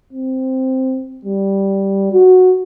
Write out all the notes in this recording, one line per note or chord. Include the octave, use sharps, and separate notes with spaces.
C4
G3
F#4